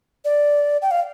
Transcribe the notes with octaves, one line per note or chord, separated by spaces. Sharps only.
D5
G5
F5